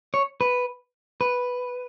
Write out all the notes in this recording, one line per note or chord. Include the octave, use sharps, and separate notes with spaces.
C#5
B4
B4